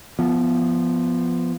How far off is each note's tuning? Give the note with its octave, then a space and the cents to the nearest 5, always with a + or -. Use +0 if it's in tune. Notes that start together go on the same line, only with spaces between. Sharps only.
F3 -5 B3 +0